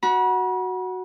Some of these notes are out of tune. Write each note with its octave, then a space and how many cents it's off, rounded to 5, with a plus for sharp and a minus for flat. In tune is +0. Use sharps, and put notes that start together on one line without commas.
F#4 +0 B5 -40